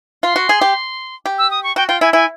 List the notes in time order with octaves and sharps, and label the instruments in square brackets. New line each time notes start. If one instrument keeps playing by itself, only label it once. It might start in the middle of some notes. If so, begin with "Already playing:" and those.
[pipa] F4 [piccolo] C6
[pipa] F#4
G#4
G4
G4
[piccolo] E6
D#6
C#6
[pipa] F#4 [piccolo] G5
[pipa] F4 [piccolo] G5
[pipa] E4 [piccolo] G#5
[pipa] E4 [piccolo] G#5